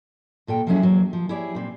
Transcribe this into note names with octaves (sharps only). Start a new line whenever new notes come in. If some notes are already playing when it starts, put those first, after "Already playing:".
D2 A#2 A4 G5
F3 F#3 G#3 A3 C#4 E4
E2 F#3 A#3
F3
E4 G4 G#4 C#5 D5
A#2 C4